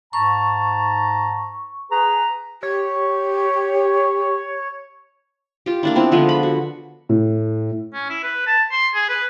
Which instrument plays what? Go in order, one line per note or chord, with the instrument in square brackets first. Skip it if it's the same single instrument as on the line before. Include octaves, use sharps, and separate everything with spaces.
[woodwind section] G#2 A5 A#5 [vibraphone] C#6
[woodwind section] G#4 B4 [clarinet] A#5
[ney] G4 [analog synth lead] C#5
[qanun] F4 G4
A#3 D4 E4
B3 C4 E4
D3 F3 G#3 B3
B5
F#4
[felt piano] A2
[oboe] C#4
E4
B4
A5
C6
G#4
B4